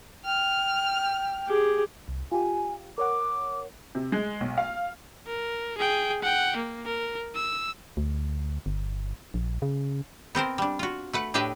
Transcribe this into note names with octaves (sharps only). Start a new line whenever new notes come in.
G5 F6
G4 G#4
C2
F4 G4 G#5
A#4 C#5 F#5 D6
C3
G#3
B1
F5
A#4
G#4 G5
F#5 G5
A#3
A#4
E6
D2
G1
A#1
C#3
B3 C4 A#4 C5
G3 D4
F4 F#4
A3 B4 F#5
A2 D4 G4 B4 D#5 E5